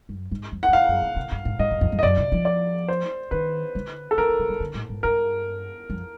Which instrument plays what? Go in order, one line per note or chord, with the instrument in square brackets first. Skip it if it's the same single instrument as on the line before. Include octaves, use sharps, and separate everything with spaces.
[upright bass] F#2
G#2
F2
[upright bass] E2 [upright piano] F#5
[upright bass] F2 [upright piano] F5
[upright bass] F#2
C3
C3
G2
G#2
[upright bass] G#2 [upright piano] D#5
[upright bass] G2
F2
F2
[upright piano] D#5
[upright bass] F#2 [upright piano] D5
[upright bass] C3
F3
[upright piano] D5
C5
[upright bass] D#3 [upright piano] B4
[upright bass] D3
[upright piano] A4
[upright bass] C#3 [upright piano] A#4
[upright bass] D3
C#3
D3
D3
A2
G#2
[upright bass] G2 [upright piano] A#4
[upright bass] F2